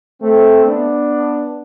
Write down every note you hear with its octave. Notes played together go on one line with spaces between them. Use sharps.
A3 C4
B3 D4